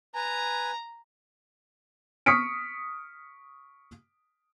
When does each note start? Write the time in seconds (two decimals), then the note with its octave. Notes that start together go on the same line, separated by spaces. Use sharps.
0.15 B4 G#5 A#5
2.26 C#6 D#6 F6 B6 C#7 D7